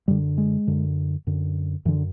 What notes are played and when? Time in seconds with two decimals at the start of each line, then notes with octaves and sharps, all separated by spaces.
0.08 F#2 D3 G3
0.38 G#3
0.67 F#2 D3
1.27 F#2 D3
1.85 F#2 D3 E3